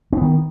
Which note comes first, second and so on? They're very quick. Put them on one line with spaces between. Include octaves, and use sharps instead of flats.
C4 B3 D#3